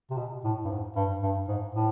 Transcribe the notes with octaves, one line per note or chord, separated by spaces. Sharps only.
C3
B2
A2
G2
G#2
G2
G2
G#2
A2